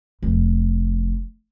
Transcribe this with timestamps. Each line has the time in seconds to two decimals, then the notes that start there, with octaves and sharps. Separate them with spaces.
0.22 F1 F3